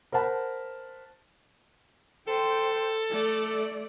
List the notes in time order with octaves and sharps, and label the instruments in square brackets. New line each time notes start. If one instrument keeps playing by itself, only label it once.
[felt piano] A#4 C5 F#5 A5 B5
[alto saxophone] A4 [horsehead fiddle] C5 G5
[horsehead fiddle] A3 D5